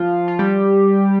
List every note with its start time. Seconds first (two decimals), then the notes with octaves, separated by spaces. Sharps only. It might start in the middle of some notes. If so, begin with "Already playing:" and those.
Already playing: F3 F4
0.28 F4
0.39 G3 G4